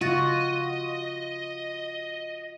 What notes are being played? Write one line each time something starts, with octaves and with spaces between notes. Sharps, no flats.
C#3 F4 F#4 D#5 A6